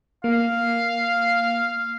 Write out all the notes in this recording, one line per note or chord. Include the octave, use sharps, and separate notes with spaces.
A#3 F5